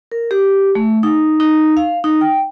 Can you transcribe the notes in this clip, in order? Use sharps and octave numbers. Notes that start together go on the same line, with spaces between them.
A#4
G4
A3
D#4
D#4
F5
D#4
G5